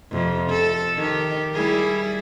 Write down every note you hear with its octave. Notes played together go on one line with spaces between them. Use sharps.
F2 C3
A4
D#3 G4
G3 E4 G#4